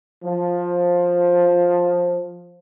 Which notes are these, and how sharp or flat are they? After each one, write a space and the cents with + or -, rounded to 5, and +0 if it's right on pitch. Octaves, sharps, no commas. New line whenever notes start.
F3 +10